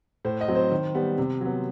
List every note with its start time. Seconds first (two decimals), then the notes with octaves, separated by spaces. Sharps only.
0.25 A2 C5
0.41 D#5
0.48 F#3 C4
0.55 C5
0.72 D#3
0.94 G3 B3
1.18 C3
1.41 F#3 B3